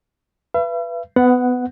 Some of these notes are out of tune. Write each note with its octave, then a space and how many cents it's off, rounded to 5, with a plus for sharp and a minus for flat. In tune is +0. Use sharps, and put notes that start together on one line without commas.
B4 +0 E5 +45
B3 +20 F#5 +0